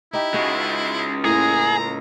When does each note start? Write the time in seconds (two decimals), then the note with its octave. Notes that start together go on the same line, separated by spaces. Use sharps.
0.13 D#4 E4 G4
0.34 C#2 G#3 F#4
1.25 A2 A#3 G#4 A#5